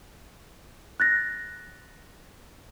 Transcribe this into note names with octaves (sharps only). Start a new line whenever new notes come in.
F#6 A6 A#6